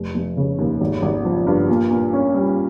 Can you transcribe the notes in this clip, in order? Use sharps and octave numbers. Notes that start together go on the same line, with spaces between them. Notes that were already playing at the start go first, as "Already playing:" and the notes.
Already playing: F1
F1
C#3
D#2
G#1
G#1
F3
G2
A#2
A#2
C#4
G3